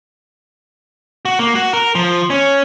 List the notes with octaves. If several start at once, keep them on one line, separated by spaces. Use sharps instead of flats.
F#4
A#3
F#4
A#4
F3
C#4